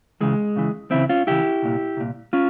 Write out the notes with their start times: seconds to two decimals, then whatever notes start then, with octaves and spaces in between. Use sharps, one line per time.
0.21 C#2 C#3 E3 G#3
0.56 C#2 C#3 E3
0.91 C#2 C#3 E3 C4 E4
1.09 C#4 F4
1.27 C#2 C#3 E3 E4 G4
1.62 C2 A#2
1.97 C2 A#2
2.33 C#4 F4